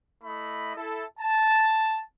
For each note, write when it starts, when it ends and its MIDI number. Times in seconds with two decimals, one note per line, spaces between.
0.24 0.73 57
0.24 0.73 64
0.24 0.73 75
0.24 0.73 83
0.76 1.05 64
0.76 1.05 69
1.20 2.01 81